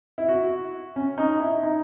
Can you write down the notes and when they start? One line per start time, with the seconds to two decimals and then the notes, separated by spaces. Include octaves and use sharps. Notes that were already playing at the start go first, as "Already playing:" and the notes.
0.18 E4
0.28 F#4
0.96 C#4
1.18 D#4
1.40 E4
1.63 D#4